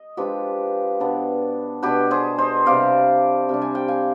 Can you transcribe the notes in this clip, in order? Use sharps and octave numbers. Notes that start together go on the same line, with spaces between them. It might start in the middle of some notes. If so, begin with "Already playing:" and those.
Already playing: D#5
F3 G#3 D4 F4 G4 B4
B2 B3 D4
B2 B3 D4 G4 B4
G#4 C5
C5 D#5
C3 G3 D4 D5 F5
C3 G3 D4
G#5
G5
F5 G#5